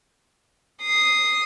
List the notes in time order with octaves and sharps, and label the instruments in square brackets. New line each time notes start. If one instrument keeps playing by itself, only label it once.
[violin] D#6 C7